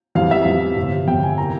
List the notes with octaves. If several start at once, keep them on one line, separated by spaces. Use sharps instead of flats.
F2 E3 G3 F5
E5
F2 E3 G3 F5
G1 F2 C3
G1 F2 C3 G5
G#5
C3 E3 A#3 A#5